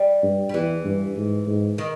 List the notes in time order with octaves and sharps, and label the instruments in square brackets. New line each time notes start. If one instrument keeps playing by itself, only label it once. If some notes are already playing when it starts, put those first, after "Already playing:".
Already playing: [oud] G3
[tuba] G2
[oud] G3
[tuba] E2 [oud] E3
[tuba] G2
G#2
G#2
[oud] D#3